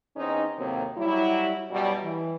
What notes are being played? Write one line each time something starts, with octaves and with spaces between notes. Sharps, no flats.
E2 C4 C#4 D#4
D#2 A2 C3 F#3 A#3 C4
F#3 G3 E4
F#2 B2 F#3 G3
E3